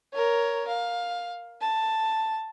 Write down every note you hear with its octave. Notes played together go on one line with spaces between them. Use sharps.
A#4 C#5
F5
A5